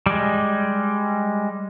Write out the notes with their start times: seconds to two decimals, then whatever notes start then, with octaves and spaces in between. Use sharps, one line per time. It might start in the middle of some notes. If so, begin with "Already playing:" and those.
0.06 G3 G#3